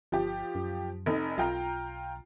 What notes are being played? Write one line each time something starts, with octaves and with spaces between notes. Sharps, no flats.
G1 F3 G4
F#2
F1 D#4
B1 F4 G5 A#5